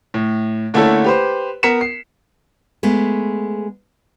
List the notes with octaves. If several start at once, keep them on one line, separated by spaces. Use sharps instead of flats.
A2
D3 A3 A#3 C#4 E4 A4
G4 B4 C5
B3 A#4 B6 C#7 E7
C7
G#3 A3 B3